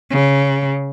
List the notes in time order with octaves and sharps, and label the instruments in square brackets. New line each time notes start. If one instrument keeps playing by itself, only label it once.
[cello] C#3